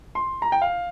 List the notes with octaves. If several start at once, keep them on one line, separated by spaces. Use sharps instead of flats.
C6
A#5
G5
F5